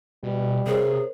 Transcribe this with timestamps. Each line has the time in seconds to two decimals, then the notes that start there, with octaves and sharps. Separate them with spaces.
0.23 B2 G3
0.67 C3 G#4 A#4 C5 C#5